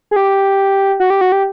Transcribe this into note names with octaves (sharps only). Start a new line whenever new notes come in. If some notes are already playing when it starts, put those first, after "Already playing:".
G#4
G4
F#4
G4
F#4
G4